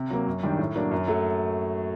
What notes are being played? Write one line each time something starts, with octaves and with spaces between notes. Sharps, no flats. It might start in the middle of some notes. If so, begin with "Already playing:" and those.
Already playing: C3
F#3 A#3
F#2
D#3 G3 D4
A2
F#3 A#3 D4
F#2
F#3 A3